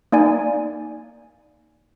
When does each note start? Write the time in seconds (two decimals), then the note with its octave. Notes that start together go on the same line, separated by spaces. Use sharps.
0.12 A#3 D#4 D5 G#5